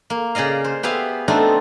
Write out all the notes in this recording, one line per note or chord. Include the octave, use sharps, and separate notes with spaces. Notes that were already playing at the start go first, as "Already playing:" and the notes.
A#3
C#3 G#4 D5 D#5 F5
C5
B3 G4 G#4 B4 E5 F5
A3 B3 C4 D4 D#4 F4